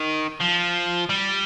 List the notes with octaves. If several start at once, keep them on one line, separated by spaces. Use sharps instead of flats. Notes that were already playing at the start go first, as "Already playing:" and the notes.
Already playing: D#3
F3
G3